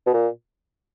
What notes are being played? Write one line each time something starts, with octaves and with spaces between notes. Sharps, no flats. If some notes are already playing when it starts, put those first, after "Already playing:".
B2
A#2